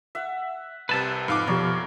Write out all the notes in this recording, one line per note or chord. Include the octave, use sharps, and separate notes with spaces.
E5 F#5
C2 C3 B4 A5
F2 G#2 D#4 F5 D6 F#6
B2 F3 G4 A#4 C#5 D5